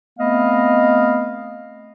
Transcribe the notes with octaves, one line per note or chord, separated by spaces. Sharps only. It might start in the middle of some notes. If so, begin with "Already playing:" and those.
A3 B3 C4 D#5 F5